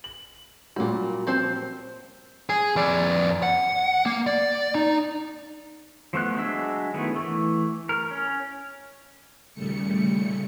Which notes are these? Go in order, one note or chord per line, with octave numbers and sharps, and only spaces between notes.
F#7
A#2 F#3 G3 A#3 F#4
F3 C4 C5
G#4
F2 D5
F#5
A#3
D5
D#4
F3 A3 B3 F#6
F#3 G#3 D4 E5 E6
D#3 A3 B3 E4
E3 A3
A#4
C#4
D#2 A#2 C#3 G3 A3 C#7